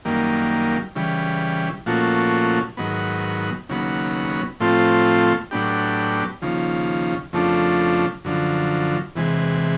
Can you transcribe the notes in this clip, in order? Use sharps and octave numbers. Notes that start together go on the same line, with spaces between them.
F#2 D#3 G3 A#3
C#3 E3 G3
A#2 F3 A3 C#4 F#4
G#2 D#3 F#3 B3
D#2 C#3 F#3 B3
A2 F3 A3 C4 F4
A2 F#3 B3 D4 G4
D#2 C#3 F3
F2 C#3 F3 A3 D4
F#2 D3 F3
E2 C3 E3 G#3